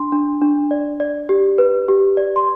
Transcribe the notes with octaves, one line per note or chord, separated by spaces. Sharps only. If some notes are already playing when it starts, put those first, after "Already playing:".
Already playing: D4 C6
D4
D4
D5
D5
G4
B4
G4
D5
C6